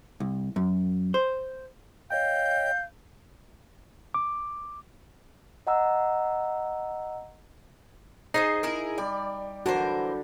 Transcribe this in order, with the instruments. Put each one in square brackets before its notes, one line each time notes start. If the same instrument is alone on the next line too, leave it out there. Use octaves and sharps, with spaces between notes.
[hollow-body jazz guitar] C2
F#2
C5
[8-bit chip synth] C#5 D#5 G5 [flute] F5 [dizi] G6
[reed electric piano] D6
[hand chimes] D#5 F#5 A#5 E6
[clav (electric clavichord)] D#4 [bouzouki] G#4 C5 D#5
[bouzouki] E4 G#4 A#4
[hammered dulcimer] G3 [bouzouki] D5
[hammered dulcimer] D3 [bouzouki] E3 A#4 C5 [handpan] F#4